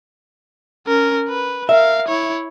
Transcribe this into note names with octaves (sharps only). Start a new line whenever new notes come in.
C#4 A#4
B4
A#4 E5 F5
E4 C#5